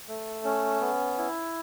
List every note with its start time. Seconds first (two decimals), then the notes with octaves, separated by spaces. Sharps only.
0.08 A3
0.44 C#4
0.81 B3
1.18 E4